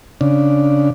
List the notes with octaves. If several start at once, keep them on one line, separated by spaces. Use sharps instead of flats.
C#3 D4